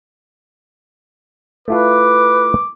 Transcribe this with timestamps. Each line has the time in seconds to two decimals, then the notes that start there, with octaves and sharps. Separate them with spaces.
1.68 A3 E4 F4 B4 D6